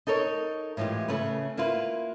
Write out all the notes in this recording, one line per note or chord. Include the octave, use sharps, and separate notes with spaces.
D#4 A4 A#4 C#5
A2 E3 G#3 F4 G4
C#3 A3 C#4 B4
A#3 E4 F4 B4